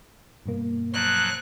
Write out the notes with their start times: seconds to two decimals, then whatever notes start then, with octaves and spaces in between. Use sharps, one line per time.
0.46 G2 B2 A#3
0.93 F3 F#3 F#6